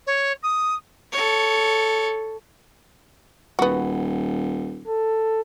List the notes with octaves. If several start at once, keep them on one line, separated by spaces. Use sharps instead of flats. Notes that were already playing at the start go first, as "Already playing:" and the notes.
C#5
D#6
A4 C#5
D#1 B3 F#4
A4